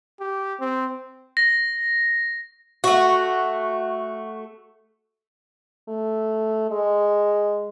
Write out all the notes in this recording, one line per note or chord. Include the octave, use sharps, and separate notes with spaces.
G4
C4
A#6
A3 F#4
A3
G#3